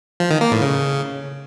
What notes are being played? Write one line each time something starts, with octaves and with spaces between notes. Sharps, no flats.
F3
D#3
A#3
A2
C#3